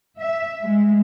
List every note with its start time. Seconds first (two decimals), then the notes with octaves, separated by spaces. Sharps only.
0.18 E5
0.62 G#3